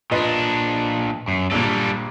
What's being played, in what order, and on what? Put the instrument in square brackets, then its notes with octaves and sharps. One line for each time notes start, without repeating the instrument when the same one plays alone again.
[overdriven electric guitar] A#2 D4 [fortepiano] F4 B4 D#5
[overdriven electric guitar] F#2
[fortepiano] A#1 G2 A#2 [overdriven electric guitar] G3 A4